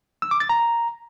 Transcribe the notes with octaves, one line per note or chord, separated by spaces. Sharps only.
E6
D6
A6
A#5